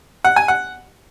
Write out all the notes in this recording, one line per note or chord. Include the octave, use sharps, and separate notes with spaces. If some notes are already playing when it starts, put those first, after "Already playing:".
F#5
G#5
F#5